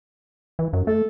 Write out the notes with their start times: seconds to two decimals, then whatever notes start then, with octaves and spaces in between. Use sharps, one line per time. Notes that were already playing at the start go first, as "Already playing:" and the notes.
0.59 E3
0.73 F#2
0.87 A3 A4